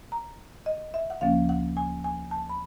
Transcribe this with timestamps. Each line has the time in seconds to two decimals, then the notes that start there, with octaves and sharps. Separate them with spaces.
0.12 A#5
0.66 D#5
0.94 E5
1.10 F#5
1.21 D2 C#3 F3 A#3 C#4 F5
1.49 F#5
1.77 G#5
2.04 G#5
2.31 A5
2.49 B5